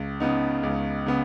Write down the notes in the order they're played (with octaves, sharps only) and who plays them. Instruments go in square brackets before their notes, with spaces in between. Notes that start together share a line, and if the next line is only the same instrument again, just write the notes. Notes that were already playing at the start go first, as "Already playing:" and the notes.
Already playing: [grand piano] C#2
C#3 B3 D#4
C#2
C#3 B3